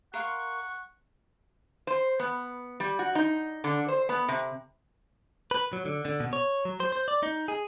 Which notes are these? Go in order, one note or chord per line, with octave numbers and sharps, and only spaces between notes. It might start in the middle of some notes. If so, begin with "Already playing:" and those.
A#4 F5 F#5 C6 C#6
C5
B3
G3
F#4
D#4
D3
C5
B3
C3
B4
F#3
D3
D3
B2
C#5
F#3
C5
C5
D5
D#4
G#4